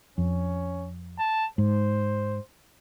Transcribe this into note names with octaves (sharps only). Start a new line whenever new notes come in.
F2 C#4
A5
G#2 C5